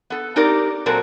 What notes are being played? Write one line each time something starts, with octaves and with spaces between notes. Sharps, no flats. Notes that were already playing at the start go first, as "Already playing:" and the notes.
B3 A4
C4 D#4 G4 A#4 D5
A#2 F#3 C4 A4 A#4